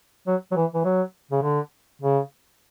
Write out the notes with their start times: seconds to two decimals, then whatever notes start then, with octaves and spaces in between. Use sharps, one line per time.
0.27 F#3
0.52 F#3
0.56 E3
0.74 E3
0.85 F#3
1.31 C#3
1.43 D3
2.02 C#3